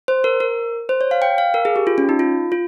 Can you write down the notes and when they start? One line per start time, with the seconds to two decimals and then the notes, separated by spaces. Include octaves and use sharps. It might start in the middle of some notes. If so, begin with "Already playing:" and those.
0.08 C5
0.24 A#4
0.40 A#4
0.89 C5
1.01 C#5
1.11 F5
1.22 G5
1.38 F5
1.54 A#4
1.65 G#4
1.76 G4
1.87 F4
1.98 C#4
2.09 D#4
2.19 F4
2.52 F4